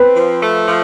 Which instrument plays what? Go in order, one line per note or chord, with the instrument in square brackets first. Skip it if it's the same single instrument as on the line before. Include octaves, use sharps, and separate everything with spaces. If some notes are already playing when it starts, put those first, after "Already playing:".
Already playing: [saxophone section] C4 [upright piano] B4
[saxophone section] F3
A3
F3